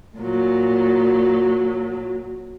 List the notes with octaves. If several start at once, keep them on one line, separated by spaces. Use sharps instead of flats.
A#2 F#3